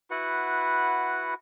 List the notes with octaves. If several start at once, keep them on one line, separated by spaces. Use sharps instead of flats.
E4 F#4 B4 F#5